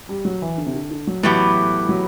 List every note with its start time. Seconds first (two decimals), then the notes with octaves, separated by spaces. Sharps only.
0.09 G3
0.25 F#3
0.42 E3
0.58 D3
0.66 C3
0.74 D3
0.91 D3
1.07 F#3
1.23 A2 E3 F#3 B3 E4 G4
1.89 F#3